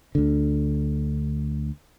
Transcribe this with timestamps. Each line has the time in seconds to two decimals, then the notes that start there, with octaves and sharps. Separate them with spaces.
0.15 D2 D3